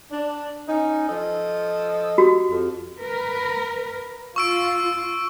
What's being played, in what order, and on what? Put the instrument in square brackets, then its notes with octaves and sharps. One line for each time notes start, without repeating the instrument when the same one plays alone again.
[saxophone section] D4
C#4 D#4
F3 A4 D#5
[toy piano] F#4 G4
[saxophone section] F2
[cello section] A#4 B4
[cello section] F4 [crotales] C#6 E6 D7